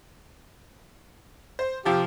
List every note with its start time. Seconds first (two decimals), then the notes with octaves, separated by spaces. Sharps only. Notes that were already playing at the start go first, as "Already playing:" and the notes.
1.59 C5
1.85 C3 F3 F4 G4